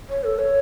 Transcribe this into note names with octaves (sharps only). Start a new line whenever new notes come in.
C#5
A4
C#5